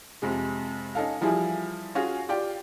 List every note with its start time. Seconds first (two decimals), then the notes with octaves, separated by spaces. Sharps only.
0.22 F2 C3 G#3
0.95 C#4 D#4 A4 F5
1.21 E3 F3 G3 E4 G#4
1.95 C#4 F4 F#4 G#4
2.29 F4 G4 D5 G5